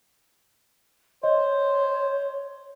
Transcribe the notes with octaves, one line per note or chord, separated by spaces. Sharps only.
C5 C#5 D#5